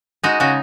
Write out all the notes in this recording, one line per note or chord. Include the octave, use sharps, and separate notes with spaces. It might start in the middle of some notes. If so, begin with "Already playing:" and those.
G#3 D#4 F#4
C#3 D#4 F#4